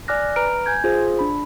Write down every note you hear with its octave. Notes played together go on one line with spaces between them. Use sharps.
D5 G#5 D6 F6 F#6 A#6
B4 A#5 F6 D7
G#5 G6 G#6
F4 G#4 C5
D4 B5